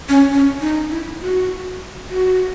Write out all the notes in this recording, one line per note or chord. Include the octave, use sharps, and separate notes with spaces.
C#4
C#4
D#4
E4
F#4
F#4